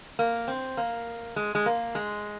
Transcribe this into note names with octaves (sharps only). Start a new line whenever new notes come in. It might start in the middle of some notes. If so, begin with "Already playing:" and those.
A#3
C4
A#3
G#3
G#3
A#3
G#3